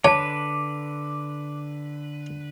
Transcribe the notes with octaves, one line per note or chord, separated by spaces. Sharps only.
D3 B4 C#5 A5 D6